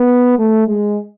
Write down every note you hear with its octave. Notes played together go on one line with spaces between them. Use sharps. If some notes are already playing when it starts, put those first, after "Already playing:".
Already playing: B3
A3
G#3